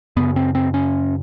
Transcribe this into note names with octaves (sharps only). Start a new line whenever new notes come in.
F#2 C#3 B3
C4
C4
C#4